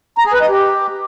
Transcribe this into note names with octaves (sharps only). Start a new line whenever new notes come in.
A#5
G#4
B4
D#5
G4